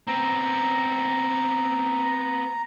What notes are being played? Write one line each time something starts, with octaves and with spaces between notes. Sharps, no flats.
B3 C4 A#5